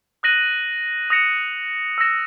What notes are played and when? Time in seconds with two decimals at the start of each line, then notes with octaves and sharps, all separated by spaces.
0.23 D#6 F#6 A#6 D#7 F#7
1.10 D#6 A#6 C#7 E7
1.98 E6 A#6 E7